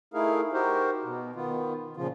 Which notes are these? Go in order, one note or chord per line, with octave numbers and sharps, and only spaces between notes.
A3 D#4 E4 G#4 A#4 F5
D#4 F#4 G4 A#4 C5
B2
D#3 B3 F4
A#2 C#3 F3 F4